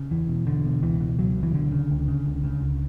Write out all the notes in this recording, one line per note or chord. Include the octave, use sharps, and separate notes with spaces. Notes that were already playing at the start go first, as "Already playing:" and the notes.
Already playing: C#3
E2 E3
B2
E2 D3
B2
C#2 E3
B2
C#2 F#3
B2
E3
C#2 D3
C#3
C#2
C#3
C#2
C#3
C#2